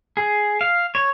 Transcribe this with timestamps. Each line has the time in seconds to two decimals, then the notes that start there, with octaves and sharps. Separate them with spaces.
0.17 G#4
0.61 F5
0.95 C#5